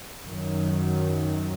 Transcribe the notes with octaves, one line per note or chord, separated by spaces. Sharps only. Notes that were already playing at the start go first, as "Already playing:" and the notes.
F#2 D#3 F#3